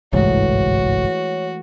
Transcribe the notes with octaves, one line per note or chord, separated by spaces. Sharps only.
G1 C2 G#2 E3 G#3 A3 F#4 C#5